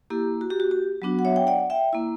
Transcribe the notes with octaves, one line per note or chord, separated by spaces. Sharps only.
A#3 E4 G4
F#4
G4
F#4
G4
F#3 B3 D4 F#4
F#5
C#5 E5
G5
D5 F#5
E5 G5
A#3 E4